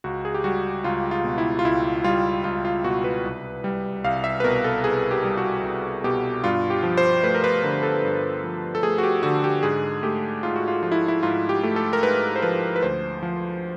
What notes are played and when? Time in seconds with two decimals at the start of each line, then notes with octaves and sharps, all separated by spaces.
0.04 C#2 F#4
0.25 G#4
0.34 G4
0.44 G3 F#4
0.84 C#2 F4
1.11 F4
1.24 B2
1.38 E4
1.59 F4
1.65 C#2 E4
2.04 G3 F4
2.44 C#2 F4
2.65 F4
2.84 B2 F#4
3.04 B4
3.24 C2
3.64 G3
4.04 C2 F5
4.24 E5
4.40 B4
4.44 B2 A#4
4.64 A4
4.84 C2 G#4
5.11 G4
5.24 G3
5.37 F#4
5.63 C2
6.04 B2 G4
6.44 G2 F4
6.70 G4
6.83 F3
6.98 C5
7.23 A3 B4
7.34 A#4
7.44 B4
7.64 D3 A#4
7.83 A4
8.04 G2
8.44 F3
8.75 A4
8.83 A3 G#4
8.98 F#4
9.03 G4
9.23 D3 F#4
9.44 G4
9.63 G#2 G#4
10.03 A3 G4
10.43 G#2 F4
10.56 F#4
10.68 F4
10.83 F3 F4
10.92 E4
11.08 E4
11.23 G#2 F4
11.49 G4
11.63 A3
11.76 A4
11.93 A#4
12.03 G#2 B4
12.36 C5
12.42 F3 B4
12.76 B4
12.82 D2 C5
13.23 F3